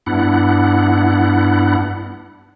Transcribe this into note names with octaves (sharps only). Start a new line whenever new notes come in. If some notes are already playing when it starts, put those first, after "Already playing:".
G2 B3 D4 E4 F#5